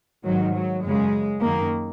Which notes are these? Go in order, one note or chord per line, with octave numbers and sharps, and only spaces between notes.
G#2 D#3 F#3
F#3
F#2 C#3 G#3
F#2 D#3 A#3